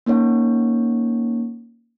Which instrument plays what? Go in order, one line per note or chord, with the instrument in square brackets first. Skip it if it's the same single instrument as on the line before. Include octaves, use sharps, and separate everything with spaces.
[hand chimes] A#3 C#4 D#4 C#5 F#5